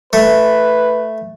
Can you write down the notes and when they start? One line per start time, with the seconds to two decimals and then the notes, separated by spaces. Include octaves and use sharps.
0.13 A3 B4